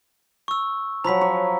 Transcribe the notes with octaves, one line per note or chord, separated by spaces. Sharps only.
C#6 E6
F3 F#3 A#5 B5 B6
C#5